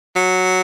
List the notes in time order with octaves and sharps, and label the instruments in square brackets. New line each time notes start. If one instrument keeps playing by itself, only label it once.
[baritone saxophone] F#3